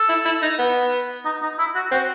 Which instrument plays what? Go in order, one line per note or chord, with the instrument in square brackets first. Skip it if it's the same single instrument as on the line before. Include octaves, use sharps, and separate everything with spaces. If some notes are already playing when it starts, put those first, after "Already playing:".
Already playing: [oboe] A4
[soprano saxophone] E4
E4
D#4
B3
[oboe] D#4
D#4
E4
F#4
[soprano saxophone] C4 [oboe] F#4